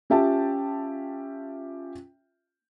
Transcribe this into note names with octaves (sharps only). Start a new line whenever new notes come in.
C#4 F4 G4 E5 G5 A5